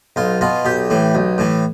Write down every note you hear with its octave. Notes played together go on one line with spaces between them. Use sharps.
B1 F4
B2 F4
B1 G4
A2 E3
B1
A2 E3